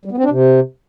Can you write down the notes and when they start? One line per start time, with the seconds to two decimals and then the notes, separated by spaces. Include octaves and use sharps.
0.05 G3
0.11 B3
0.18 C4
0.24 D4
0.30 C3